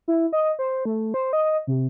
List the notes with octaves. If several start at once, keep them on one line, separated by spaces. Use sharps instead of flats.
E4
D#5
C5
A3
C5
D#5
C3